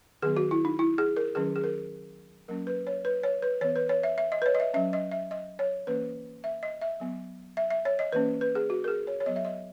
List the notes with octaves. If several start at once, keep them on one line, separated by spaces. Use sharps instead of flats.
D#3 F#3 B3 G#4
F#4
E4
D#4
E4
G#4
A#4
D#3 F#3 C#4 G#4
G#4
A#4
F#3 A#3 C#4 A#4
B4
C#5
B4
C#5
B4
E3 B3 C#5
B4
C#5
E5
E5
D#5
B4
C#5
D#5
E5
F#3 C#4 E5
D#5
E5
D#5
C#5
E3 A#3 C#4 B4
E5
D#5
E5
F#3 B3
E5
E5
C#5
D#5
E3 A#3 C#4 B4
B4
G#4
F#4
A#4
G#4
C#5
C#5
F#3 B3 D#5
E5
D#5